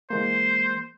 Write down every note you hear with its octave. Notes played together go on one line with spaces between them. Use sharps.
E3 G#3 A#3 C5